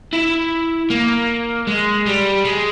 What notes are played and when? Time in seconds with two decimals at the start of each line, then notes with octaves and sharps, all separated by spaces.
0.13 E4
0.90 A#3
1.67 G#3
2.06 G3
2.45 G#3